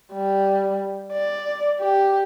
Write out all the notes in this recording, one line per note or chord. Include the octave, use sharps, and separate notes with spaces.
G3
D5
G4